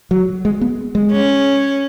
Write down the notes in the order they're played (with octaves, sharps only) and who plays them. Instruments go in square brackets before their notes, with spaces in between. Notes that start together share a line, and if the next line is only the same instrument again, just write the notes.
[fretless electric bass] F#3
G#3
B3
G#3
[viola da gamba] C#4